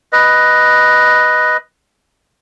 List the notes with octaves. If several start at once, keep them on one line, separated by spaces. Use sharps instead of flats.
B4 D#5